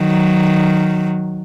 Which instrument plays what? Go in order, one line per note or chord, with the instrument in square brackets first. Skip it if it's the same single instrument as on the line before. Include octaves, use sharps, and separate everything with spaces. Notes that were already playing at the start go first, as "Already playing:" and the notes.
Already playing: [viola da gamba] D#3 F#3